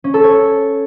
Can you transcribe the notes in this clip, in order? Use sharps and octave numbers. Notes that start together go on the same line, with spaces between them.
C#4
A4
C#5